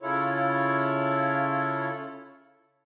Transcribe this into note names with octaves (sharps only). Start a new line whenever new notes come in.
C#3 E4 F4 A4 C#5